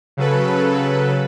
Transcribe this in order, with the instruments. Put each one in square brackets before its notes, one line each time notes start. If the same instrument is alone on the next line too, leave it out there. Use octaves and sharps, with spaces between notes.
[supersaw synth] C#3 F#3 A4 B4